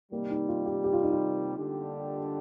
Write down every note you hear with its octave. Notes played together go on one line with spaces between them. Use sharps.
C3 D#3 G3 A#3
D#4
F4
G4
G4
F4
D#4
F4
D3 G3 D4 G4